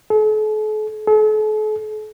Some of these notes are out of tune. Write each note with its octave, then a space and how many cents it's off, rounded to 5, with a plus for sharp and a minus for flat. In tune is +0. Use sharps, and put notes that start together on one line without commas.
A4 -45
A4 -45